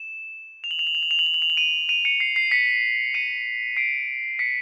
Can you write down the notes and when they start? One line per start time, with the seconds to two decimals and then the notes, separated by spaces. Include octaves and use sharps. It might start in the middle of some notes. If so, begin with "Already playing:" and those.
Already playing: E7
0.64 F7
0.71 F#7
0.79 F7
0.87 F#7
0.95 F7
1.03 F#7
1.11 F7
1.19 F#7
1.26 F7
1.34 F#7
1.42 F7
1.50 F#7
1.57 D#7 F7
1.89 D#7 F7
2.05 C#7 D#7
2.20 C7
2.36 C7
2.51 B6 C#7
3.14 C#7 D#7
3.77 C7 D7
4.39 B6 C#7